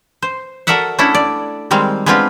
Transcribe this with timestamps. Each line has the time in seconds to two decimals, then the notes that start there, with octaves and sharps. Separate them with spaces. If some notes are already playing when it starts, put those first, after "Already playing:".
0.22 C5
0.67 F#4 A4 A#4 D5 E5 F#5
0.99 A3 C#4 D4 E4 A4 F#5
1.15 D5
1.71 D#3 G3 G#3 C4 F5
2.06 G#3 B3 C4 D4 F4 G4